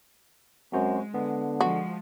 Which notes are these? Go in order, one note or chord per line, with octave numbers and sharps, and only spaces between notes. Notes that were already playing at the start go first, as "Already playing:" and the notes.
F#2 G#3 C4 F#4 C5
D3 B3
F3 G#3 F#4